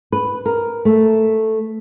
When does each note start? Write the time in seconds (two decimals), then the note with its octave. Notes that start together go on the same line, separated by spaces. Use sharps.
0.12 B4
0.46 A#4
0.85 A3